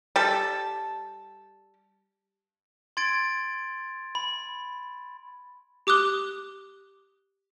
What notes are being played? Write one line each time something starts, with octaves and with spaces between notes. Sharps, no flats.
G3 A4
C6 G#6 A6 D7
B5
G4 D6 D#6 F#6 G7